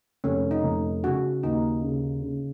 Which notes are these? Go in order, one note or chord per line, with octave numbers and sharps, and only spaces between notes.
F1 C#4
D#4
F1
C#3 F#4
D#2 D#4
C#3
C#3